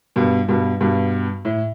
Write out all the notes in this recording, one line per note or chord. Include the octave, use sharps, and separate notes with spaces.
G2 B2
G2 B2
G2 B2
A2